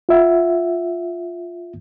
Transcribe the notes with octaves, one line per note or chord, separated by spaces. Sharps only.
F4 E5 F#5